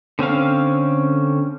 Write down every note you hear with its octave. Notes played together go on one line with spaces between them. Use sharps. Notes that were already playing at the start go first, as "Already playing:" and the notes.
D3 C4 C#4 F5